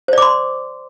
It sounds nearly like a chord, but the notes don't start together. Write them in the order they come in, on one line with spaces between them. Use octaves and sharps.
C5 D5 D6 C6